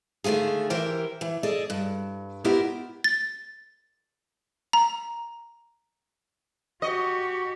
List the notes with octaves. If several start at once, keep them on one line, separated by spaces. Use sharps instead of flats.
D3 D#3 A3 F4 G#4
E3 G4 A#4 C5 G5
E3
G#4 A4 D5 D#5
G2
B3 E4 F4 G4 A#4 D#5
A6
A#5
F#4 G4 D#5 C#6